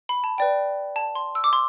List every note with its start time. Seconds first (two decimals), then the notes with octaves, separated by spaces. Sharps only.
0.09 B5
0.24 A5
0.38 B4 D5 G5
0.96 A5
1.15 C6
1.35 E6
1.44 D6
1.53 C6